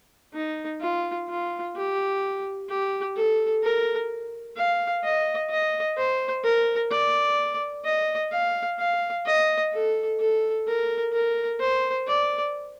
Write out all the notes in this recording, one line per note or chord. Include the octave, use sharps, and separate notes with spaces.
D#4
F4
F4
G4
G4
A4
A#4
F5
D#5
D#5
C5
A#4
D5
D#5
F5
F5
D#5
A4
A4
A#4
A#4
C5
D5